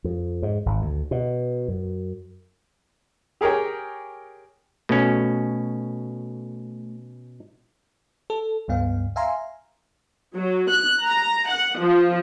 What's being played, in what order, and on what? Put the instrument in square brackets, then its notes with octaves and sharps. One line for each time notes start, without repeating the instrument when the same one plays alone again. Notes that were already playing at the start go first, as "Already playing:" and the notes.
[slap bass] F2
G#2
G#1
D2
B2
F#2
[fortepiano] G4 G#4 A#4 C#5 G5
[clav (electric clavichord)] B2 C#4 [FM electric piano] A3
[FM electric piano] A4
C#2 G2 B3 F5
E5 F5 G#5 A#5 C6
[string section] F#3
F#6
A#5
F#5
F3